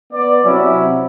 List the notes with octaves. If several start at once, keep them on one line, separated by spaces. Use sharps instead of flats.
B3 D5
C3 F#3 C4 C#4 E4